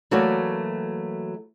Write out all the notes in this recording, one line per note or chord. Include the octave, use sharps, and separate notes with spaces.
E3 F#3 A3 A#3 F#4 D5